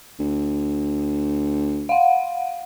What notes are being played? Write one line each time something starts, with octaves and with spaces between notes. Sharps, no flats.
D2
F5 F#5